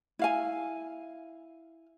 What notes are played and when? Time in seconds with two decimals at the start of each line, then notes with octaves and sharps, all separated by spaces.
0.19 E4 F5 G#5